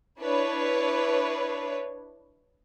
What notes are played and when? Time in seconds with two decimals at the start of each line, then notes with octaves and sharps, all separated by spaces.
0.19 D4 E4 B4 C#5